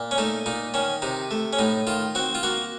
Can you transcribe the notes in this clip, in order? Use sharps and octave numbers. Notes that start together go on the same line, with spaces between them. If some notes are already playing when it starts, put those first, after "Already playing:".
Already playing: A#2
C#4
A3 D#4
A#2 D#4
D#3 C#4
C3 D#4
A3
C#4
A2 D#4
D#3 F4
C4 F#4
F4
A#3 F#4